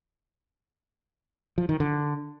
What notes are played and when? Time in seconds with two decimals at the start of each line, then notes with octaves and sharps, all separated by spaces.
1.58 F3
1.69 D#3
1.80 D3